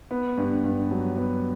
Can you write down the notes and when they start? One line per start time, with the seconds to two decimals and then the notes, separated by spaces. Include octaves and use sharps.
0.11 B3
0.37 G2
0.64 G2
0.91 F#3
1.17 B3